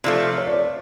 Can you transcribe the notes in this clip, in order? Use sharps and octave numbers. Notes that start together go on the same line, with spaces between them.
C3 F3 A3 D5
C#5
D5
C#5